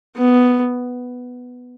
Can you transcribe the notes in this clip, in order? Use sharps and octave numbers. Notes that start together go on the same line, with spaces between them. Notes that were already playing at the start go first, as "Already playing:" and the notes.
B3